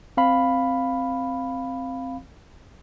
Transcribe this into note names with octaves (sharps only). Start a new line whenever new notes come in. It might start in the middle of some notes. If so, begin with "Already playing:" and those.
C4 F5 B5